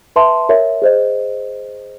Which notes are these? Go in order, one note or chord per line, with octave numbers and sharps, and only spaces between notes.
B4 E5 A5 C6
A#4 C#5 E5
G#4 C5 D#5